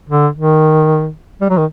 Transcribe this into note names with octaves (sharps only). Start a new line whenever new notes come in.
D3
D#3
G3
F#3
D#3